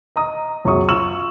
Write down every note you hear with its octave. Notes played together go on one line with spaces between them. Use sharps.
D#5 A#5 D#6
C#2 F#2 B2 F#3 C#6 D#6
F4 C#6 E6 E7 F#7